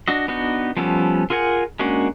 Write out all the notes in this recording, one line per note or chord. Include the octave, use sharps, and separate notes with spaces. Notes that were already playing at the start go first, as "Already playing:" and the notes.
D4 F#4 D#5
B3 D4 D#4 F#4
F3 G3 B3 C#4 A4
F4 G#4 A#4 F#5 G#5
G#3 A#3 C#4 D4 F#4